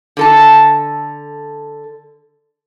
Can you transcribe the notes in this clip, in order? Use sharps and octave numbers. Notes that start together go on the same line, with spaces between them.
D3 A4 A5